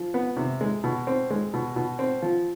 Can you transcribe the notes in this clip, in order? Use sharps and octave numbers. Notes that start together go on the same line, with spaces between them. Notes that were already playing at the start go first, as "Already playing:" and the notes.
Already playing: F3
B3
C3
G#3
B2
C4
G#3
B2
B2
C4
F3